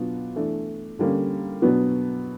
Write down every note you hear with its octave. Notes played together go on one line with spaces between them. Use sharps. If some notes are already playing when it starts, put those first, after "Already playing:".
Already playing: B2 F#3 B3 D4 F4
E3 A3 D4
D3 G3 A#3 C#4
B2 F#3 B3 D4